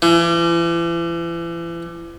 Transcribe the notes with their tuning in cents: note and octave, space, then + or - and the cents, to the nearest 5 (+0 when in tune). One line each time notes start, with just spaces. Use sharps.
E3 +40